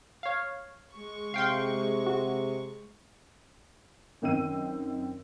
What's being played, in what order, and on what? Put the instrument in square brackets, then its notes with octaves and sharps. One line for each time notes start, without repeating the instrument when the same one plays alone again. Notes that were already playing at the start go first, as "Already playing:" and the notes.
[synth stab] C#5 F5
[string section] G#3 C#6
[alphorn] C3 [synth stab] F5 G5 C6
[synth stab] F#4
[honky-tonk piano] F#2 D#3 C4 G5 E6 D#7